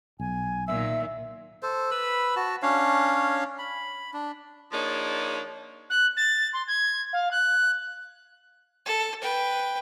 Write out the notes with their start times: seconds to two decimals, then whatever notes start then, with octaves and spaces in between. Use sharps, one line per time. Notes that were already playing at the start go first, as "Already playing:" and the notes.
0.20 B1 G#5
0.68 A#2 D#3 E5 E6
1.62 A4 C5
1.91 B4 B5 E6
2.36 F#4 A5
2.63 C#4 D4 C#5 F5
3.59 B5
4.14 D4
4.72 F3 A#3 D4 D#4 G#4 C#5
5.89 F#6
6.16 A6
6.53 C6
6.67 G#6
7.13 F5
7.31 F#6
8.86 A4
9.21 B4 G5